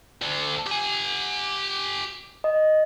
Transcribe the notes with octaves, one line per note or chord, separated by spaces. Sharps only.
D2 D3
G4 G#5
D#5